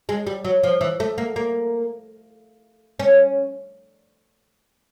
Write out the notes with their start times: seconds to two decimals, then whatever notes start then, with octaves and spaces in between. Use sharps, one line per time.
0.09 G#3
0.27 G3
0.45 F#3
0.63 F3
0.81 E3
1.00 A3
1.18 A#3
1.36 A#3
2.99 C#4